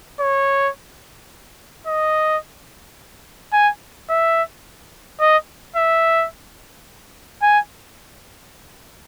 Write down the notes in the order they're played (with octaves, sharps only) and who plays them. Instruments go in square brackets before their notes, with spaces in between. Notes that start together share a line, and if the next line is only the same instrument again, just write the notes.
[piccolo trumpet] C#5
D#5
G#5
E5
D#5
E5
G#5